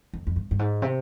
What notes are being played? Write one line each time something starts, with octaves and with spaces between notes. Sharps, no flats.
F2
F2
G2
G2
G#2
C3